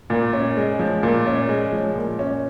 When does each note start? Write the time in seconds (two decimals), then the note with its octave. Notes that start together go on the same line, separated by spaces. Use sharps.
0.10 A#2
0.33 C#4
0.57 G#3
0.79 F3
1.03 A#2
1.27 C#4
1.49 G#3
1.73 F3
1.95 A#2
2.19 C#4